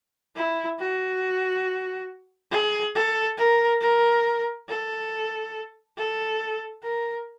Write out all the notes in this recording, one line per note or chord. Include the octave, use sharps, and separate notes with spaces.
E4
F#4
G#4
A4
A#4
A#4
A4
A4
A#4